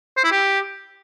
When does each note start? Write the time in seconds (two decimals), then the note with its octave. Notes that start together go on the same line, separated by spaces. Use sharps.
0.17 C5
0.24 E4
0.31 G4